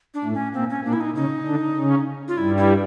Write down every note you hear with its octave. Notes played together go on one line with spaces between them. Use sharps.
D4
A2 A3
C#4
A#2 A#3 C4
C#4
A#2 A#3 D4
E4
D#4
C#3 C#4 D#4
D3 D4
C#3 C#4
F4
G2 G3 E4
E4